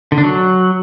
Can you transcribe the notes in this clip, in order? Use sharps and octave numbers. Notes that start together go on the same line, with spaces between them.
D3
D4
F#3